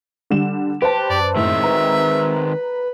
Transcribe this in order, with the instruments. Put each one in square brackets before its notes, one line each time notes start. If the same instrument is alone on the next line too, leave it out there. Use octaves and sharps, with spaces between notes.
[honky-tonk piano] D3 G3 E7
[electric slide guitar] G4 [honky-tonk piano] B4 C5 A5
[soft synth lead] F#2 [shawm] D5
[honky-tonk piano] A2 [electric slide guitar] D#3 G#3 C4 [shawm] E5
[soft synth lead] B4 [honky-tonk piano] A#5